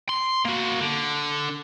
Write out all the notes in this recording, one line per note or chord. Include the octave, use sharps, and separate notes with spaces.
C6
A#3 F#4
D3